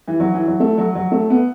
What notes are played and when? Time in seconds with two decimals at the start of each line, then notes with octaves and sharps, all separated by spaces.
0.08 E3
0.20 F#3
0.34 E3
0.47 F#3
0.60 A3
0.78 F#3
0.95 F#3
1.12 A3
1.30 B3